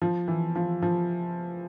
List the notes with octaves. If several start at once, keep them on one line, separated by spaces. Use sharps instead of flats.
F3
E3
F3
F3